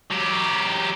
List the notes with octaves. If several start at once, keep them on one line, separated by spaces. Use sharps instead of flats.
F#3 G4